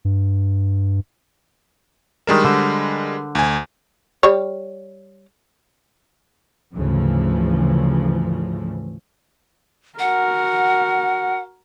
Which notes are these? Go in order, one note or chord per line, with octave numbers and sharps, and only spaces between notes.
G2
D#3 G3 G#3 D4 A#4 A5
D3 C5
D2 G#5
G3 C#5
D2 G#2 C#3 E3 F3
F#4 A#4 F#5